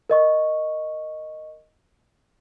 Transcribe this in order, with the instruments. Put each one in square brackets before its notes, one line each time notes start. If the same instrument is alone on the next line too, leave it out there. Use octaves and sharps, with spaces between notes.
[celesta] A#4 D#5 C#6